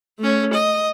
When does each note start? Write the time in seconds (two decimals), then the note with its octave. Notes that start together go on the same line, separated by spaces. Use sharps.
0.19 A3 C#4
0.53 D#5